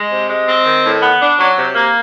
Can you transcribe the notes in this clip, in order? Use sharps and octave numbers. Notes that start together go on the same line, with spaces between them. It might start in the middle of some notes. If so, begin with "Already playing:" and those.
Already playing: G#3
C3
G#3
C4
D#3
A2
B3
D4
F#3
C3
A#3